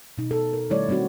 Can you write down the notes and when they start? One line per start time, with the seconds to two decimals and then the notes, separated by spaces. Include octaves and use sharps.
0.18 B2 D#4
0.31 A4
0.53 A#4
0.70 D#3 G3 A3 E4 C#5 D5
0.88 G3 A#3 C4 D4 F#4